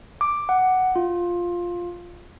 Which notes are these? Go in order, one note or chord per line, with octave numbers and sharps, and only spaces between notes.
D6
F#5
F4